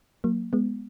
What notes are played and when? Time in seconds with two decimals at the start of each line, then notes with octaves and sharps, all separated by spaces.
0.24 F#3 A#3
0.53 G#3 B3